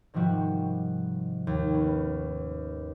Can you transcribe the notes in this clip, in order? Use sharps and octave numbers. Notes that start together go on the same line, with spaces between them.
G#2 C3 D#3 F3 G3 F#4
D#2
B3 C#4